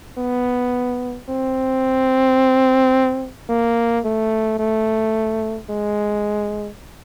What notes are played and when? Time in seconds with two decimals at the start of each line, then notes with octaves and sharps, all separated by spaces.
0.18 B3
1.29 C4
3.50 A#3
4.05 A3
4.59 A3
5.70 G#3